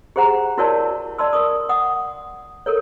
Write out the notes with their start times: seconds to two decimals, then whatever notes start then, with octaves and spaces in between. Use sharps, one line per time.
0.16 G4 G#4 C5 F#5 A#5
0.58 E4 F#4 A#4 C#5 D5 A5
1.18 D5 A5 C6 E6
1.33 A#4 C#6 D#6
1.69 F#5 D#6
2.66 A4 A#4 C#5